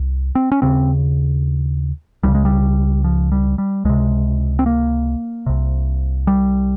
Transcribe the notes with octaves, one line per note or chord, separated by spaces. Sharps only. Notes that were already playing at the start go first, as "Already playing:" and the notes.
Already playing: C2
C4
C#4
D#2 C#3 C4
C#2 C#3 G3
G#3
G3
F3
G3
G3
C#2 C3 G#3
C4
A#3
C2 C3
G3